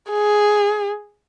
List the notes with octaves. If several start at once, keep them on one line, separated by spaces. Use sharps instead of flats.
G#4